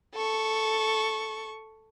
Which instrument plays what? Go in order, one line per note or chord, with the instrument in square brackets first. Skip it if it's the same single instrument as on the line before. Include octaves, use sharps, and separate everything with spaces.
[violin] A4 C#6